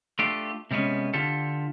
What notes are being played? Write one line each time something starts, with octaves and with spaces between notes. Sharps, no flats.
A3 D4 F4 G4
C3 G3 G#3 B3 C#4
D3 F4 G4 A4